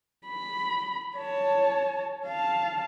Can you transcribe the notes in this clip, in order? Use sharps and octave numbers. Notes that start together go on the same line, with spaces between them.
B5
C#5 A5
F5 A5